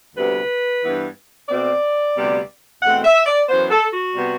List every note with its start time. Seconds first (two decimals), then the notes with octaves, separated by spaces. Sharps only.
0.16 D2 C3 G3 B3 B4
0.83 G2 E3 B3
1.49 B2 A3 C4 D5
2.15 D2 C3 G3 B3
2.82 E2 B2 A3 C4 F#5
3.04 E5
3.26 D5
3.48 F#2 E3 B3 C5
3.70 A4
3.93 F#4
4.15 C3 G3 B3